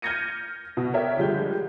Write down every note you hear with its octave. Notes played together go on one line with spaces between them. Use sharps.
F6 G6 G#6 A#6 C#7 D#7
B2
A#4 C#5 D5 E5 G5
D3 F3 G3 G#3 G6